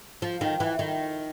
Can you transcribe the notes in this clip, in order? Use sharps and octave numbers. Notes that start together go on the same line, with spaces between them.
F3
D#3
E3
D#3